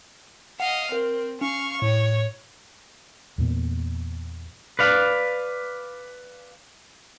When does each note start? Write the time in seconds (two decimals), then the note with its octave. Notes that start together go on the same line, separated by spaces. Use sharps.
0.60 D#5 F5 F#5
0.92 C4 A#4
1.41 C#4 F5 C#6
1.82 A2 C#5
3.38 E2 A#2 B3
4.79 B4 D5 F5